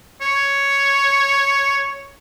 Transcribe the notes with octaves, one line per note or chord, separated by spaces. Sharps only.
C#5